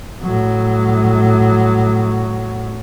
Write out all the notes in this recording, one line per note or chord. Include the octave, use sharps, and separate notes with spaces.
A2 F#3